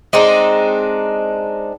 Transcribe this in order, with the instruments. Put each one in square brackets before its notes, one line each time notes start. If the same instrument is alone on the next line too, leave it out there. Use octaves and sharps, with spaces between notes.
[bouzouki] G#3 C4 D4 D#4